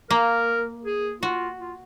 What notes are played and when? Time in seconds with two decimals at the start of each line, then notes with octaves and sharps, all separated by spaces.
0.10 A#3 A#4
0.85 G#4
1.22 F4 F#4
1.60 F4